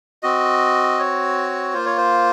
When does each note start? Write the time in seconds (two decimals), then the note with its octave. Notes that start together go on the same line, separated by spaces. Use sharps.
0.23 C4 F#4 D#5
0.99 C#5
1.74 A#3 F4 C5
1.86 C#5
1.97 C5